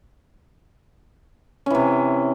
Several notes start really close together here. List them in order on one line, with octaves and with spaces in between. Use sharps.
C#4 E3 C3